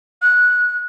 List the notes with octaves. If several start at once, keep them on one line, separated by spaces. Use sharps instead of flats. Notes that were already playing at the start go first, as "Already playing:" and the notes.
F#6